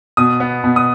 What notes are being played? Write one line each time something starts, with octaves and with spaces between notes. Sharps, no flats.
B2 D#6
B3
B2
D#6